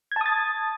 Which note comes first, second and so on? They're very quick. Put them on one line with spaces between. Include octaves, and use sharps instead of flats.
G#6 A5 D#6 A6